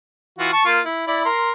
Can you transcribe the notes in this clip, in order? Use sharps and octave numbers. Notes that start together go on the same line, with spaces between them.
E3 F4 F#4
A5 C#6
A#3 F4
E4
E4 D5 B5
A#4 C6